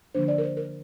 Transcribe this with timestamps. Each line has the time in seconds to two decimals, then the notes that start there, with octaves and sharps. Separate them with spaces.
0.15 D3 F3 A#3 D4 C5
0.28 D5
0.38 A#4
0.44 C5
0.57 A#4